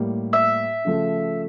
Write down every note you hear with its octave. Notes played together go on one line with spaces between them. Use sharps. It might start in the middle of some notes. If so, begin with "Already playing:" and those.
Already playing: A2 G3 A#3
E5
C#3 F3 A3